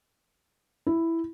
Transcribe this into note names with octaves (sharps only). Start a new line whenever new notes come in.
E4